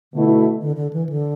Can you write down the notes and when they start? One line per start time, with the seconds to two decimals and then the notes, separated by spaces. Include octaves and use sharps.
0.13 B2 D3 A3 E4
0.61 D3
0.76 D3
0.93 E3
1.09 D3